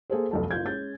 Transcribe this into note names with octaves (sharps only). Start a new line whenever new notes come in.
A#3 G#4 A4 C5
F1 B1 A5
F#1 F4 G6 G#6
G#3 C#4 G6 A6